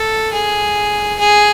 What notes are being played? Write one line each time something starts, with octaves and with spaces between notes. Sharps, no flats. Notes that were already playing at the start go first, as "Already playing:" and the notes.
Already playing: A4
G#4
G#4